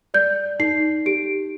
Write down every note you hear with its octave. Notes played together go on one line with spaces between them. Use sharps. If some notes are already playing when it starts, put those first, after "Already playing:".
D5 G6
D#4 C7
G4 D7